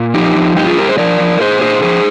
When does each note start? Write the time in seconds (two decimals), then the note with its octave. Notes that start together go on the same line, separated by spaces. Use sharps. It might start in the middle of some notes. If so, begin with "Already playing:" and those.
Already playing: A#2
0.14 F3 D#4 G4
0.36 F3
0.57 G2 D#4 G4
0.67 F4 G#4
0.77 G2 G4 A#4
0.89 G#4 C5
0.98 F3 A#4 D5
1.20 F3
1.40 A#2 G#4 C5
1.61 A#2 G#4 C5
1.82 F3 G#4 C5